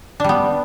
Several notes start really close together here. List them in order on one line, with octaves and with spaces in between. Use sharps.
D4 G3 B3